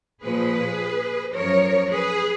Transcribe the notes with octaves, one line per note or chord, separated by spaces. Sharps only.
A#2 F3 G#4 B4
F#2 F3 A#4 C#5
G#4 B4